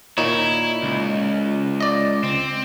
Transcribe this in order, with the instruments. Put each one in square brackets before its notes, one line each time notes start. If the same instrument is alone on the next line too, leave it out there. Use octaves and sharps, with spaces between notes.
[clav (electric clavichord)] A#2 D#4 C#5 [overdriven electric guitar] E4
[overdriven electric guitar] C#2
[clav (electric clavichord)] D5 D#5
[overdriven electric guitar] C4